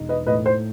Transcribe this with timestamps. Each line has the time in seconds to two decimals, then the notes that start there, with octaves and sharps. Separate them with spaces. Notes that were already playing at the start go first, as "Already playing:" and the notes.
Already playing: E1 D#4
0.09 B4 D#5
0.27 A2 B4 D#5
0.46 C5